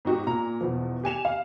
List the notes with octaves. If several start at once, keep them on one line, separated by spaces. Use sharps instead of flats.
G#2 D#4 F#4 G4
A#2 A#5
E2 B2 F3
G4 G#5 E7 F7
F5